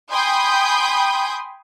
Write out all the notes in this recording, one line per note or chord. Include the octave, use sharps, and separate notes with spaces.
G5 G#5 B5 C6 D#6 G6